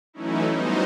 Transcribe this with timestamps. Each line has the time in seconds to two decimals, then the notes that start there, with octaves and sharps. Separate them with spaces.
0.13 E3 F#3 A3 C#4 D#4 E4
0.52 G3 B3 D#4 F#4 C5 D#5